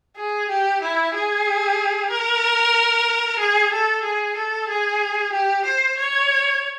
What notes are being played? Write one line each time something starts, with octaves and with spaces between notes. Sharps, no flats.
G#4
G4
E4
G#4
A#4
G#4
A4
G#4
A4
G#4
G4
C5
C#5